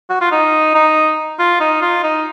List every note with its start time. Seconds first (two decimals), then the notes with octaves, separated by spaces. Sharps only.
0.10 F#4
0.21 F4
0.31 D#4
0.75 D#4
1.39 F4
1.61 D#4
1.81 F4
2.03 D#4